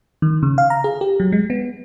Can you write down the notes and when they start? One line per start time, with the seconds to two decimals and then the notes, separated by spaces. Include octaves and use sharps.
0.22 D#3
0.43 C#3
0.58 F5
0.70 A#5
0.84 G#4
1.01 G4
1.20 F#3
1.32 G#3
1.50 B3